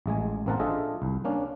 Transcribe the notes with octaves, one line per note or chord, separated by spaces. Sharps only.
A1 G#3 G#5
A1 A#3 C4 A#4 F#5 A5
D4 F4 G#4 A4 D#5 E5
C2
A#3 C#4 D4